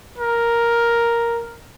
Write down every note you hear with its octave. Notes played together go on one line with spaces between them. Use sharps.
A#4